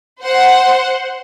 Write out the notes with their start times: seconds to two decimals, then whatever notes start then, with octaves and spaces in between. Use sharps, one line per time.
0.22 C5 F#5